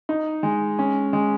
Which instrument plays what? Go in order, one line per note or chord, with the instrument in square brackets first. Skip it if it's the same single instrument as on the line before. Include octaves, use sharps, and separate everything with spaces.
[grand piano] D#4
G#3
C#4
G#3